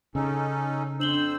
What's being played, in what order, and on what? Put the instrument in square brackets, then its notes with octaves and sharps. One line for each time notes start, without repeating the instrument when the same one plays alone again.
[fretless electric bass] C#3 [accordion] C#4 D#4 A4
[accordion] F2 C5 E6 [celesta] D4 F#7 G7